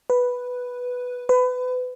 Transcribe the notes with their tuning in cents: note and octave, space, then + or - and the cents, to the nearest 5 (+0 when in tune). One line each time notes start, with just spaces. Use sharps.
B4 +0
B4 +30